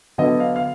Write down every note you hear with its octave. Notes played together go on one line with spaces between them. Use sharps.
D3 F#3 B3 D#5
F5
F5